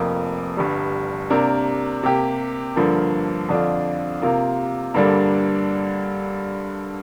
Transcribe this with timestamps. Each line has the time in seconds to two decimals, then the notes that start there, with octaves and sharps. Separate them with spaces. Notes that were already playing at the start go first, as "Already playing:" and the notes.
Already playing: F1 F2 F3 A#3
0.57 G1 G2 G3
1.30 C3 A#3 D4 A#4
2.03 C3 A#3 G4
2.76 G2 D3 F3 A#3
3.49 F2 D3 F3 D4 F4
4.22 C3 A#3 F4 A#4
4.94 G2 D3 G3 A#3 D4